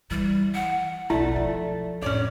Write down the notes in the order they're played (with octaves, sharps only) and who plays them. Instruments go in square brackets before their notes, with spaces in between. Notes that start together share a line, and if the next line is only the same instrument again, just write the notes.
[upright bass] E3 [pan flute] G3
[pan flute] F#5
[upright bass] B1 E2 [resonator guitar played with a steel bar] A3 [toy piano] E4 [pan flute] D5
[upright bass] F3
[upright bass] F2 A2 [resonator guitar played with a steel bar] C#4 D5 [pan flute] C#5